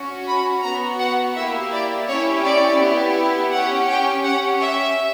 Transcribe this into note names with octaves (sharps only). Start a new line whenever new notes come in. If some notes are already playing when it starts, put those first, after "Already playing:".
Already playing: C#4 F#4
B5
B3 F#4 A#5
F#5
A#3 E4 G4 E5
D5
C#4 E4 G4 C#5
D5
B3 E4 G4
C#4 G4 F#5
G5
C#4 G4 F#5
E5